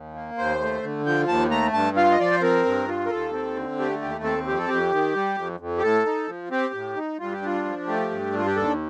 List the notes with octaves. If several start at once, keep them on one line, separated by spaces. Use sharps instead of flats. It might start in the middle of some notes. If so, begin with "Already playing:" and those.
Already playing: D#2
A#3
D#2 C5
A3
D3
F3 G5
D#2 A5
A3 A#5
G2 A5
F4 F5
D#5
F3 D5
C5
C4 A#4
G2
F4
A#4
D#2 A4
C4
D3
A3 G4
D#2 G4
C4 A4
F2 G4
A4
F2 G4
D#3
G3
F2
F2
G4
A2 A4
D#4
F3
C4 G4
A2
D#4
G2 F4
G4
D4 F4
F3
A3 G4
G2
D4 F4
G4
D#2 A4